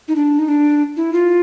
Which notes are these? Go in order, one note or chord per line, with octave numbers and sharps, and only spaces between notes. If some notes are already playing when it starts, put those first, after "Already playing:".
D#4
D4
D#4
D4
E4
F4